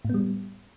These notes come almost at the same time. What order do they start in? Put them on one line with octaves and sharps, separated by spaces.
A2 B3 G3